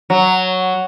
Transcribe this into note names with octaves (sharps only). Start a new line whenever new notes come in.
F#3